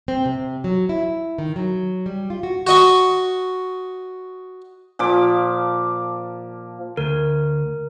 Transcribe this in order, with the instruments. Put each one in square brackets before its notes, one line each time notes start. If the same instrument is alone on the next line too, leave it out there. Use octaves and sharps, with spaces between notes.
[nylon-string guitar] C4
C3
F#3
E4
D#3
F#3
G3
F4
F#4
[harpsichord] F#4 D#5 C#6
[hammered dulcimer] A#2 F3 D6
[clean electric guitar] D2 [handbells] A#4